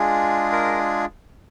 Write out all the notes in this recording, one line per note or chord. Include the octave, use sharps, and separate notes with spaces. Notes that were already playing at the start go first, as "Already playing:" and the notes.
Already playing: G#3 D4 F4 G#4
A#4